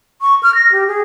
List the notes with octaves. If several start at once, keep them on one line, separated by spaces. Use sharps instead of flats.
C#6
F6
A#6
G4
G#4